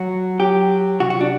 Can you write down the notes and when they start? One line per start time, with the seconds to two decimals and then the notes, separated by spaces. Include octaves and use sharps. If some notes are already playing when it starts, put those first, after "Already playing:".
Already playing: F#3 F#4
0.40 F#3 G4
1.00 C3 F#4
1.10 F#4
1.21 D4